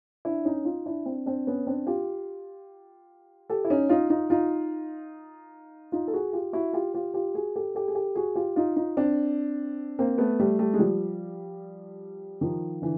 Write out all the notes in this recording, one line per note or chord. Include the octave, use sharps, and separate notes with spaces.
D4 E4
C#4 D#4
D#4 F4
D4 E4
C4 D4
C4 D4
B3 C#4
C4 D4
F4 G4
G4 A4
E4
C#4 D#4
D#4 F4
D#4 F4
D#4 F4
D#4 F4
A4
F#4 G#4
F4 G4
E4 F#4
F4 G4
F4 G4
F4 G4
F#4 G#4
G4 A4
G4 A4
G#4
G4 A4
F#4 G#4
F4 G4
D#4 F4
D#4 F4
C4 D4
A#3 C4
A3 B3
G3 A3
G3 A3
G#3
F3 G3
D#3 F3
D3 E3